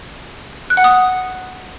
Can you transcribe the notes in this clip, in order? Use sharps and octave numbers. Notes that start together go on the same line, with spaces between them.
F#6
F#5
D#6